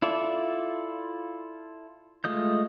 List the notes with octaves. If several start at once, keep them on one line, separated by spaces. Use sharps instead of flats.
E4 F4 A4 D5 E5
G#3 A3 F4 D#5 G6